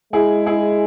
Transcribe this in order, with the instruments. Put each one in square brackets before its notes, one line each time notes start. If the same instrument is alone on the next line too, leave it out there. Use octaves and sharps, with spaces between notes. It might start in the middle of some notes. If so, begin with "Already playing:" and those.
[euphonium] G#3 [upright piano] E4 G#4
[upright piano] E4 G#4